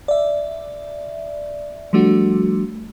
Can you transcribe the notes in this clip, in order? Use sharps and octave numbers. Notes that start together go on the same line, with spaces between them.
D5 E5
F3 G3 A3 D4 F#4